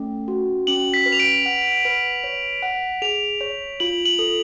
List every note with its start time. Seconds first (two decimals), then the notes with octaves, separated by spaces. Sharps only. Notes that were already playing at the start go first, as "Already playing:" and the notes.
Already playing: A3 C#4
0.28 F#4
0.67 C#4 F#7
0.94 B6
1.06 B4
1.12 F7
1.20 D7
1.46 F#5
1.85 B4
2.24 C#5
2.63 F#5
3.02 G#4 F7
3.41 C#5
3.80 F4 F#7
4.06 F#7
4.19 A4